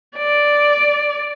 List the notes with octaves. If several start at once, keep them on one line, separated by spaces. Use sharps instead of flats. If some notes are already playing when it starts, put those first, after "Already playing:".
D5